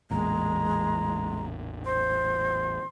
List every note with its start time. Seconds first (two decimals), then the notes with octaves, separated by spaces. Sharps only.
0.11 A1 E2 A#2 G#3 A#5
1.86 C5 C6